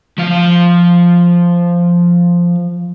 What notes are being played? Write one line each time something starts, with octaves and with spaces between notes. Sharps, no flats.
F3 F5